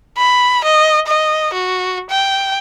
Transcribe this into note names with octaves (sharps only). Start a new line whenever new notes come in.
B5
D#5
D#5
F#4
G5